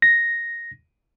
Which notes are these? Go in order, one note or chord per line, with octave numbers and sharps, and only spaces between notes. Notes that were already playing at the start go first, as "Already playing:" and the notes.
A#6